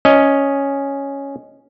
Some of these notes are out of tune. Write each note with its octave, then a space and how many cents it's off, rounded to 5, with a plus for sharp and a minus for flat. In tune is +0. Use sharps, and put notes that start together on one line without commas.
C#4 +0 D#5 +0